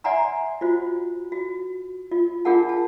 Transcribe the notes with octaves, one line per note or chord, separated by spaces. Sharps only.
D5 E5 F#5 G#5 A#5 C6
F4 F#4 C5
F#4
F4
D4 F4 G#4 A#4 F#5 A5
A5